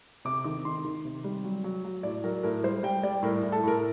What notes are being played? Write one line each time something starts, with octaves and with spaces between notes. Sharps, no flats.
C3 D6
D#3 D6
D#3 C6
D#3
C3
G3
F#3
F#3
F#3
A2 D5
F#3 A#4
A2 A#4
G3 C5
G3 G5
G3 D5
A2 A#4
A2
A4
A2 A#4